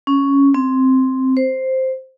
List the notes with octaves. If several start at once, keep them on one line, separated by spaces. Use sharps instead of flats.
C#4
C4
C5